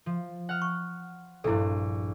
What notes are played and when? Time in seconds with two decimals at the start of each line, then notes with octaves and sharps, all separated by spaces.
0.06 F3
0.49 F#5 F6
0.62 C#6
1.44 A#1 G2 E4 A4